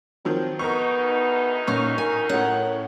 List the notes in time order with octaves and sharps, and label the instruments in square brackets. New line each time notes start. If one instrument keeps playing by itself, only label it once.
[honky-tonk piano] D#3 F3 F#3 [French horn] C4
[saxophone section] D2 D#4 [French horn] B3 [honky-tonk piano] A#4 C#6
[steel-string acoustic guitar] A#2 C#4 [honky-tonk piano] C#6
[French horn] A#4 [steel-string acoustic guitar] G#5
[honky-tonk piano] A2 C#4 [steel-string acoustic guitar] F#5